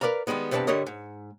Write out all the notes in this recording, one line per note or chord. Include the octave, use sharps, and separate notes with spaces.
A#4 B4 D5 F5 A#5
D#3 E3 G3 G#3 B3
E2 G2 C3 B4 D5 A5
G2 D3 G3 A#4 C#5 D#5
G#2